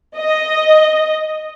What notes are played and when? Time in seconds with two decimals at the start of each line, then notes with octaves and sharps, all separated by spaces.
0.17 D#5